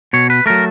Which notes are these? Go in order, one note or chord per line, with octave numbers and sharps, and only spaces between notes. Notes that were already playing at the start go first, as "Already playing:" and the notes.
B2 C#5
B4
F#3 A3 A#4